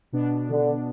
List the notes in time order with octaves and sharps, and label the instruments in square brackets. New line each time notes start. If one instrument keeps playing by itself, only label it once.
[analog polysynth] B2 B3 D4
[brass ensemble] D3